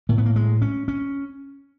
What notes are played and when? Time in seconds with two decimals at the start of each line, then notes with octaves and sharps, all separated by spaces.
0.09 A2 A#3
0.18 B3
0.26 A#3
0.36 G#3
0.62 C#4
0.88 C#4